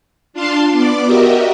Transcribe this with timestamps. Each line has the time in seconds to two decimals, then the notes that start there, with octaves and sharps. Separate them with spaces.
0.33 D4 F4 F5 A5 C6
0.72 B3 D5 D6
1.05 F#4 G4 A#4 D#5 E5